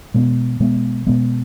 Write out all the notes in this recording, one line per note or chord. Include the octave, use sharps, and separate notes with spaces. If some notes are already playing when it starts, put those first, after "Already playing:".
B2 G#3 B3
B2 G#3 B3
B2 G#3 B3